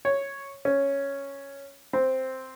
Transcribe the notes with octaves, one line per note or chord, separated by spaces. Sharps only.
C#5
C#4
C4